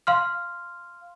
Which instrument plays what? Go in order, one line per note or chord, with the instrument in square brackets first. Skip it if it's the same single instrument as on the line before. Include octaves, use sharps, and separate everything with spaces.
[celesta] F5 C6 F6